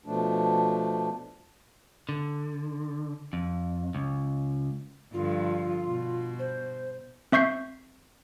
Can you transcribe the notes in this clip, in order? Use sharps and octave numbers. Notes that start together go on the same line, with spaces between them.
B2 F3 A3 D4
D3
F2
C#2
G2 D3 F3 F4
B2
C5
C4 E5 C#6 G6 C7